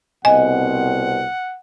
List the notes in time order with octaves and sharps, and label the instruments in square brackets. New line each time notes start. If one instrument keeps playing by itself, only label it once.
[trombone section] C2 B2 C4 [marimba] D#5 [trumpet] F#5 [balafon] G#5